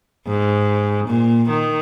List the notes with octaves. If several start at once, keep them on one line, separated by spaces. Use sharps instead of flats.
G#2
A#2
D#3